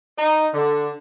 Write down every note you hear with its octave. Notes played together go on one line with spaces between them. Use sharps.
D#4
D3